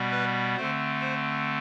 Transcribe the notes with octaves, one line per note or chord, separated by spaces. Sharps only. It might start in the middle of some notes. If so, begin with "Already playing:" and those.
Already playing: B2 G3 B3
B4
D3 A3 C4 C5
C5